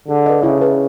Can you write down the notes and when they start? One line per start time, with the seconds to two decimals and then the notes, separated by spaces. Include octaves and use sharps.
0.08 D3 G#4
0.26 B4 D#5
0.43 C#3 E4
0.61 G#4 B4 E5 A5